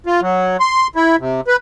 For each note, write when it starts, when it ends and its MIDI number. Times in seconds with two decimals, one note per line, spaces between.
0.06 0.21 65
0.21 0.57 54
0.60 0.87 84
0.95 1.16 64
1.19 1.41 48
1.47 1.56 71